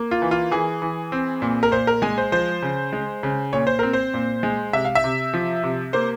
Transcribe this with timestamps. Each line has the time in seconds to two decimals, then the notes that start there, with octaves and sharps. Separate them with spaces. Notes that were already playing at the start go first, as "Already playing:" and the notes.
Already playing: A#3
0.11 F4
0.22 E3
0.31 F4
0.51 E3 G#4
0.82 E3
1.12 C4
1.42 A#2
1.63 A#4
1.72 A#2 C5
1.87 A#4
2.02 G#3 G#5
2.18 C5
2.32 F3 C5
2.62 C#3
2.93 G#3
3.23 C#3
3.53 A#2 C#5
3.67 C5
3.79 C4 A#4
3.93 C5
4.14 A#2
4.43 G#3
4.73 C3 E5
4.85 F5
4.95 E5
5.04 C3
5.34 F3
5.63 C3
5.93 A#3 C5